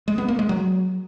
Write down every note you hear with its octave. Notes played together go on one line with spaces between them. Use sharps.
G#3
B3
A#3
G#3
F#3